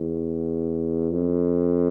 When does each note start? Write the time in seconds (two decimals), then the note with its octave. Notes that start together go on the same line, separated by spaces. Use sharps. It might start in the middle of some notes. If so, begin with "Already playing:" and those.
Already playing: E2
1.12 F2